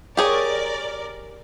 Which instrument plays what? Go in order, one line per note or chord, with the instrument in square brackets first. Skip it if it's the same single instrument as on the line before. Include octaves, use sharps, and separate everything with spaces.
[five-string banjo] G4 G#4 C#5 [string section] A#4 D5